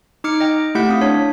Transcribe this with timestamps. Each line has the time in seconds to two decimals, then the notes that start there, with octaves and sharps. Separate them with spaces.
0.24 D#4 D6 F6 C#7
0.40 D#5 G5
0.75 A3 E4 G4 F#5 G6 B6
0.88 C4 F5 D#6
1.01 D4 C#5 B6